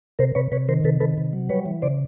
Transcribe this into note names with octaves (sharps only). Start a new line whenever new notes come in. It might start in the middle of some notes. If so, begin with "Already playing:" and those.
C3 A#4 C5
C3 B4 C#5
C3 B4 C#5
D#3 A#4 C5
C3 A4 B4
D#3 A4 B4
C3
F#3
G3 B4 C#5
E3
C#3 C5 D5